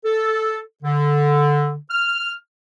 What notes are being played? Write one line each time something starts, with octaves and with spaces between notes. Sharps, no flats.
A4
D3
F6